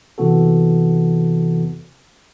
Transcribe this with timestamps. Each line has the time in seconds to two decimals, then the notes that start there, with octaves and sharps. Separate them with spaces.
0.18 C3 E3 B3 F#4 A4